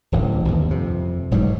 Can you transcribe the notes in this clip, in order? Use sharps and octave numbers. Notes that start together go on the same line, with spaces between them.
D1 A1 E3
G1 D#2
F2 C3
E1 G#2 F#3 G3